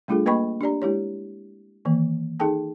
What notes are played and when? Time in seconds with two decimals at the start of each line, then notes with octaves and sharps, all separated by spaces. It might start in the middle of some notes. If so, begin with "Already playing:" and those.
0.08 G3 A3 D4 F4 G#4 A4
0.26 A#3 B4 D#5 G5 B5 C#6
0.61 D4 G4 D5 A#5
0.82 G#3 E4 G4 C#5
1.85 D#3 E3 A#3
2.40 D#4 G#4 A4 G5 A5